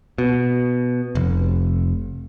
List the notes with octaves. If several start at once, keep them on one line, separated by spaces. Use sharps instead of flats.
B2
F1